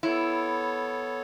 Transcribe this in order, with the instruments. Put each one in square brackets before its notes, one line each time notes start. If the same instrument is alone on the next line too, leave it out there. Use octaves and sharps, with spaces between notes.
[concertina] B3 A4 C#5 [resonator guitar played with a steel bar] E4